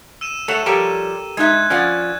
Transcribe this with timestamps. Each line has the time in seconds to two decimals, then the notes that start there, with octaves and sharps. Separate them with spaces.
0.21 E6 D#7 E7
0.48 A3 A4 C#5 F#5
0.66 F3 G3 G4 A4 A#4 C#5
1.37 G#3 D#4 E5 F#6 G#6
1.70 F3 C#4 D5 F#5